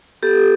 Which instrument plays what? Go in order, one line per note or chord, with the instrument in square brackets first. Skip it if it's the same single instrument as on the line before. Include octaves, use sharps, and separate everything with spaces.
[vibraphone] B3 G4 A4